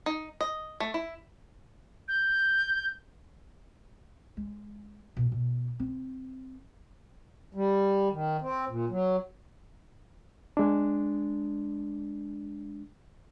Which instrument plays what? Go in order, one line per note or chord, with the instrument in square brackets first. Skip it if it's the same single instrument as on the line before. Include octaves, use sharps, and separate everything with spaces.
[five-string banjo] D#4
D#5
A3
E4
[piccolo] G6
[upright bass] G#3
B2
B2
C4
[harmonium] G3
D#3
C4
A#2
F#3
[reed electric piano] G#3 D4